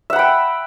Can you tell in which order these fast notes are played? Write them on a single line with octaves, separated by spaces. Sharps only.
E5 F#5 B5 G5